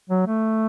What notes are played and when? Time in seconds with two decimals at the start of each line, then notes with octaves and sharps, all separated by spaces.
0.10 F#3
0.27 A3